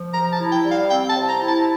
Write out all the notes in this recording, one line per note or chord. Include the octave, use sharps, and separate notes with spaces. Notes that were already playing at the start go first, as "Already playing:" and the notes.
Already playing: F3
C3 A#5
A5
E4
G5
G3
F5
C4 G5
A5
C3
A#5
E4
A5